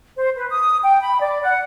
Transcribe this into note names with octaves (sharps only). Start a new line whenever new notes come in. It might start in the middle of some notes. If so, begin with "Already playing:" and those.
C5
B4
D#6
G5
B5
D5
F#5